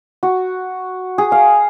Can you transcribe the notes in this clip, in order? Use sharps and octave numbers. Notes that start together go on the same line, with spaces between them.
F#4
G#4
F5